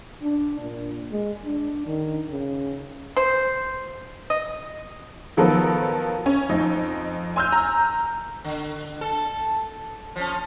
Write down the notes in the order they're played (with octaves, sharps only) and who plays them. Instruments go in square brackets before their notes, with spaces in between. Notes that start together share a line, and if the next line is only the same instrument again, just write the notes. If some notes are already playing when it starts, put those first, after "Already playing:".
[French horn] D4
A#2
G#3
D4
D#3
C#3
[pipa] C5
D#5
[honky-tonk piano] D#3 F3 F#3 B3 A4 A#4
C#4
F2 D#4
G#5 C6 E6 F6 G6
A#5
[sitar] D3
A4
F3 C#4